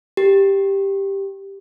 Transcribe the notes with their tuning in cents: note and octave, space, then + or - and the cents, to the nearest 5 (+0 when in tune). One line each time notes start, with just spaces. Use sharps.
G4 +5